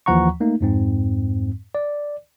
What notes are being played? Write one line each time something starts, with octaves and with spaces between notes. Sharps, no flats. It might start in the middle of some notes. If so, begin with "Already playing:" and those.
D#2 E3 F3 F#5 A#5 C#6
A3 A#3 D#4
F2 G#2 C4
D5